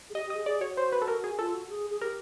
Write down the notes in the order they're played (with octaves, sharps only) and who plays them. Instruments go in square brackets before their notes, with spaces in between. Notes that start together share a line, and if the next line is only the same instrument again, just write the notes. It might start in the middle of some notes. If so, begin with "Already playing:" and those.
[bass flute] G#4
[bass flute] G4 [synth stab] D#5
[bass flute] G4
[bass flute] G#4 [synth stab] D#5
[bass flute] G#4 [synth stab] D5
[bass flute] F#4 [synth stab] C#5
[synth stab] C5
B4
A4
A#4
G#4
[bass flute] F4 [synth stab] A4
[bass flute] F#4
G#4
G#4
[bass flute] G4 [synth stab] A#4